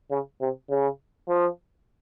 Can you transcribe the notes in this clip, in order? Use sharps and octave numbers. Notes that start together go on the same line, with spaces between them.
C#3
C3
C#3
F3